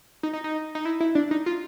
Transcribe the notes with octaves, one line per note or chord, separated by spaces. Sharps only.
D#4
D#4
D#4
D#4
E4
E4
D4
D#4
F4